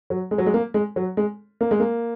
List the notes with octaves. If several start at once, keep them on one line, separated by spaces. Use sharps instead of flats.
F#3
G#3
F#3
G#3
A#3
G#3
F#3
G#3
A#3
G#3
A#3